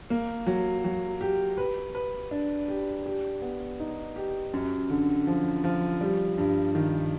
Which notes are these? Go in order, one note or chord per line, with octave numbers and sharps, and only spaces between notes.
A#3
F#3
F#3
G4
B4
B4
D4
G4
G4
B3
D#4
G4
F#2
D3
F3
F3
G3
G2
D#3